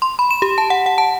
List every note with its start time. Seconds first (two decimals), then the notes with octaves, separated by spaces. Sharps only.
0.02 C6
0.19 B5
0.31 E7
0.42 G4
0.58 A5
0.70 F#5
0.86 F#5
0.98 A5